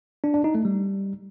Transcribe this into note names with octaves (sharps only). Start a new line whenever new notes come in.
D4
D4
D#4
A3
G3